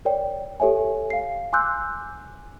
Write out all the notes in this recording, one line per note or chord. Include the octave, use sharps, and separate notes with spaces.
A#4 C#5 D5 G5
G4 A4 C#5 E5 G#5
F5 C7
G#5 C6 D6 E6 F#6 G6